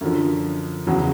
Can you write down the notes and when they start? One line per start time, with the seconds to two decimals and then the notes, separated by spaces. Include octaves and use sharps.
0.01 F#2 D3 F3
0.87 E2 C#3 F#3